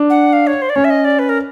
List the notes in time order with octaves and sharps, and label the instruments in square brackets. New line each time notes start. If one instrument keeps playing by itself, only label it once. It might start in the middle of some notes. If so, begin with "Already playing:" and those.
Already playing: [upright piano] D4
[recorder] F#5
F5
C#5
C5
D5
[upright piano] C#4 [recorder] C#5
[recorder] E5
D#5
D5
B4
A#4